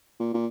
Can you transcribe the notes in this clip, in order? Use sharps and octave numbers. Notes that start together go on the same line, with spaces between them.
A#2
A#2